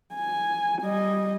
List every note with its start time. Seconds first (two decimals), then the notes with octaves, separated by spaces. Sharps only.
0.15 G#5
0.82 G3 D#5